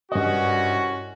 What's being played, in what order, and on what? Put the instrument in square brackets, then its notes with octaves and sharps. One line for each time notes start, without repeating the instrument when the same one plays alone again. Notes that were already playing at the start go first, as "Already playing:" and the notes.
[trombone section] C2 C#4 F#4 [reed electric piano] G2 D#5